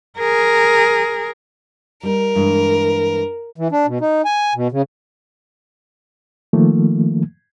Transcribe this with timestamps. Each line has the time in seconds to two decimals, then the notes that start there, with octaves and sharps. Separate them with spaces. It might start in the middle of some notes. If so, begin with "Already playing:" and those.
0.18 G#4 A#4
2.03 G3 D#4 A#4
2.35 G2 E3 G#3
3.56 E3
3.72 D4
3.86 B2
4.01 D#4
4.25 G#5
4.55 B2
4.72 C#3
6.53 D#3 F3 A3 A#3